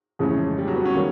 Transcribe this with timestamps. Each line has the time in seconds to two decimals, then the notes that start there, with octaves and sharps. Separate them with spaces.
0.19 F2 C#3 E3 G#3 A3 C#4
0.58 G3
0.67 F#3
0.76 B3
0.85 C#4
0.95 D#3 G3 A#3